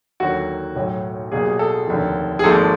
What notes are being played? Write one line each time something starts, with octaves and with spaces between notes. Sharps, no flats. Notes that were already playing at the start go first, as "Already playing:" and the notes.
D#2 D3 F#3 F#4
B1 A2 F#3
B1 B2 G3 A#3 G#4
A4
F1 D#2 D3
G#4
G#1 G#2 F3 A#3 A4